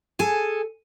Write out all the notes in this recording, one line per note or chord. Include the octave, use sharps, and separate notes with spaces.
G#4 A4 G#5